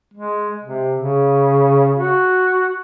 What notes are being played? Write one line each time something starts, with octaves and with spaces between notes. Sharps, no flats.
G#3
C3
C#3
F#4